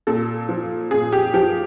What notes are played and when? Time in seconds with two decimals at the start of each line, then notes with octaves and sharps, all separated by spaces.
0.07 A#2 A4
0.49 F3
0.91 A#2 G#4
1.12 G4
1.34 F3 G4